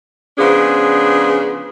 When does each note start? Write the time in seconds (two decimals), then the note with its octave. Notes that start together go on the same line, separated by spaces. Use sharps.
0.38 C#3 F3 B3 D4 G#4